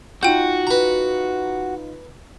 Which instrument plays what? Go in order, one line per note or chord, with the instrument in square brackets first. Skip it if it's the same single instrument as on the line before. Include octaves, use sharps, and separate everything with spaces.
[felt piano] D#4 F4 [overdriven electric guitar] F#4 [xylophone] G5 G6
[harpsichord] B4 A#5